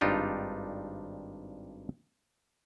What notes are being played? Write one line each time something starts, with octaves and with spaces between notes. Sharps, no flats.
G#1 G2 D4 D#4 F4 G4